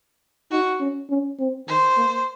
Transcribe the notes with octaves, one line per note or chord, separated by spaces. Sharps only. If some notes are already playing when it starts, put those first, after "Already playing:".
D#4 F#4
C#4
C#4
C4
D#3 C5
A#3